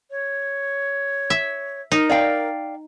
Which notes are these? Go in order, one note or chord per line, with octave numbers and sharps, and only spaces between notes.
C#5
E5
D#4 A#4
D5 F5 G5